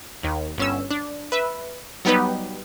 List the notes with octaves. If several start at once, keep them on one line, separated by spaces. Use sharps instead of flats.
D#2 D#3
G1 C#4 E6
D4
B4 E5
F#3 G3 B3 D#4 G4 B4